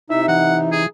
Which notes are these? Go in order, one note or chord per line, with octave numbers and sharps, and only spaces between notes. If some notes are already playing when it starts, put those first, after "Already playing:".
C3 D#4 E4 E5
E3 F#5
G#4